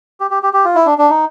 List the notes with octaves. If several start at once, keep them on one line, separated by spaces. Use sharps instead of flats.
G4
G4
G4
G4
F4
E4
D4
D4
D#4